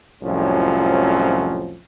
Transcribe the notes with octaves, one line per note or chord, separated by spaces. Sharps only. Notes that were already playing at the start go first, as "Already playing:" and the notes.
C2 F2 A2 F3 F#3 C#4